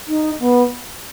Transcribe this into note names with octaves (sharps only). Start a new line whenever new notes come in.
D#4
B3